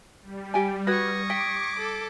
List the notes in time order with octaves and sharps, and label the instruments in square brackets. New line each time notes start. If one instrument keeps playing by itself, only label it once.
[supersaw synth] G3
[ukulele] G4 G#5
[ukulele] F#4 B4 [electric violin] C#6 D#6 [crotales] G#6 A#6
[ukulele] G5 [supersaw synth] D6 [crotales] B6 D7
[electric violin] A4